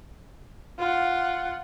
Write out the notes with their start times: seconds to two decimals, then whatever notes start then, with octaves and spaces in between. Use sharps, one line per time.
0.79 F4 F#5